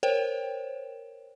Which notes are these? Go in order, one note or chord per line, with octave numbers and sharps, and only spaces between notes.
A#4 C5 C#5 G5